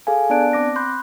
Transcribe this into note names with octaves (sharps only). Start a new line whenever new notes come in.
G#4 A4 F5 G#5
B3 D4 D5 A5 F#6 D7
C4 D6 A#6
B5 C6 F#6 G6